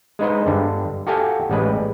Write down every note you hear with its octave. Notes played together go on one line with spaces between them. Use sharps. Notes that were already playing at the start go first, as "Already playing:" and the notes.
G#3 D#4 B4 C5
G2 D3
F#4 G4 A4 F5 G5 G#5
A1 G3 G#3 B4